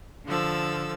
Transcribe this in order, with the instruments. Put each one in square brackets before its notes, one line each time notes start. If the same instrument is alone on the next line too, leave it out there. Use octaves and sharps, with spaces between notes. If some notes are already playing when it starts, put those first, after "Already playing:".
[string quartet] D3 F3 A4 E6